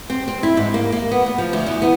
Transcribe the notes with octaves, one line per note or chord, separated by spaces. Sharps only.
C4
C4
E4
G#2
A#3
A#3
B3
B3
F3
D2
E2
B3